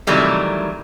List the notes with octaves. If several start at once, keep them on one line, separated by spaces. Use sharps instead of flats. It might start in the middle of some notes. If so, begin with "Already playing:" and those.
C3 D#3 E3 F#3 G3 A3